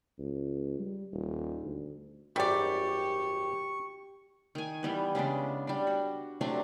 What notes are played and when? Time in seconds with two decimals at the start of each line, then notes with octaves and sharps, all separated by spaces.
0.19 C#2
0.79 G3
1.13 D#1
1.63 D2
2.36 G#1 F#2 G3 G4 D5 C#6
4.55 D#3 G#5
4.83 E3 G3 B3
5.15 C#3 G#3 B3 D4
5.67 G3 D4
5.87 F#4
6.41 C3 F#3 A3 D4